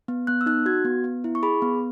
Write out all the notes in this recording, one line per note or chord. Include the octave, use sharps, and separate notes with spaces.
B3
B3 F#6
E6
D#4 F#6
F#4 G#6
B3
B3
E4
C#6
G#4 B5
B3